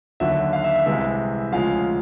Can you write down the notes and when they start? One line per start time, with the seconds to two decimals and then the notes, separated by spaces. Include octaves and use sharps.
0.20 D#2 D3 F#3 E5
0.53 F5
0.64 E5
0.75 E5
0.86 C2 C3 E3 G#3 E5
1.52 D2 C#3 F3 G#3 F5